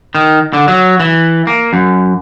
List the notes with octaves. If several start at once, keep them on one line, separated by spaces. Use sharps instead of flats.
D#3
D3
F#3
E3
A#3
F#2